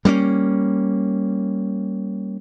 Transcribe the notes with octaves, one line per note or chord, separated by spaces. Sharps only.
G3 A#3 C4 C#4